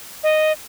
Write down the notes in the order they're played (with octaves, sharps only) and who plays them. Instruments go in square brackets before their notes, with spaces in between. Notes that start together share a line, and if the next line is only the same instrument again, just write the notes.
[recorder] D#5